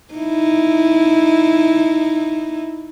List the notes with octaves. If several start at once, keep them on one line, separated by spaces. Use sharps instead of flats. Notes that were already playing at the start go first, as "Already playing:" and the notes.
D#4 E4